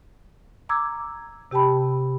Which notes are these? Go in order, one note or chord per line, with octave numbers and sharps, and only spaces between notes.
A#5 D6 E6 G#6
C3 G4 G5 A5 B5